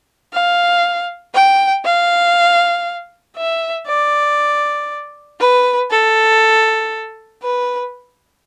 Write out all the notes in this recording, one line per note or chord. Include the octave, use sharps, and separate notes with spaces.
F5
G5
F5
E5
D5
B4
A4
B4